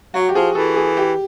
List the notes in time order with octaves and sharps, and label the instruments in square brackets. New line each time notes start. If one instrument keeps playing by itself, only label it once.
[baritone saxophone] F#3 [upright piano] F#4
[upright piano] G4
[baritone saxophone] F3 [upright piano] G#4
[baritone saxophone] E3 [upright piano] A4
[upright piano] G#4
G4